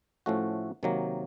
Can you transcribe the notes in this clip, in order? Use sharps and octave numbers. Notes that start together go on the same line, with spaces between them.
A2 F3 A3 C#4 F#4
C3 D#3 F#3 A#3